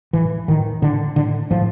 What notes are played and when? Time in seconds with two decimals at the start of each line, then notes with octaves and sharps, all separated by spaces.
0.13 A2 E3
0.48 A2 D#3
0.82 A2 D3
1.16 A2 D3
1.51 A2 F3